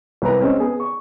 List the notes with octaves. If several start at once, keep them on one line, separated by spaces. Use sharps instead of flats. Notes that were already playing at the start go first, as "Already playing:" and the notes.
C2 B4 A#5
G#3 C4 C#4
B3 G#4
C#6